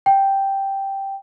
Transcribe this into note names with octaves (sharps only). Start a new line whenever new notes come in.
G5